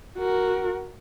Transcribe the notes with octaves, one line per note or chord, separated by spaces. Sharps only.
F#4 A#4